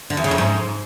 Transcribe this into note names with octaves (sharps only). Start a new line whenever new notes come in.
D3
E2
C#3
F2
G#2